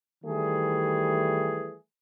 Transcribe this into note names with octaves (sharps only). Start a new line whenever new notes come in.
D#3 E3 G3 A3 G#4